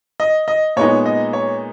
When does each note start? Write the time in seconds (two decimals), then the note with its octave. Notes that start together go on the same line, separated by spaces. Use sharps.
0.20 D#5
0.48 D#5
0.76 A#2 G#3 B3 D#4 C#5
1.06 D#5
1.33 C#5